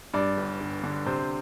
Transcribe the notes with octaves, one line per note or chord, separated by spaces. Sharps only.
G2 D5
G1
G1
D3
C3 C5